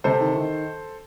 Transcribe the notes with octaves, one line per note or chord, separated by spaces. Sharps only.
C3 A4 C5
D#3
D#3